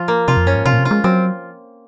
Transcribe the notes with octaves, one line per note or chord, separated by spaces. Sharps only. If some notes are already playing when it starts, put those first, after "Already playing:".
Already playing: F3 F4
A#3
C3 F4
F2
F#2 C#4
G#2
C3 F4
A#2
C3
F4
G#3
F#3 C4